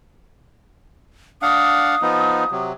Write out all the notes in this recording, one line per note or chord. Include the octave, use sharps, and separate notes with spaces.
D4 F5 F#5 D#6
F3 B3 D#4
C3 F#3